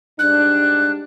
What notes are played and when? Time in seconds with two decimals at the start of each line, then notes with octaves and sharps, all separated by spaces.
0.19 G#2 G3 D4 F#6